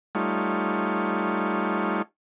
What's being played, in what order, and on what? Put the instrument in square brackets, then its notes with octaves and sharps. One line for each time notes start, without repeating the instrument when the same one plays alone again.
[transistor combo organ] G3 A3 D#4 F4 C#5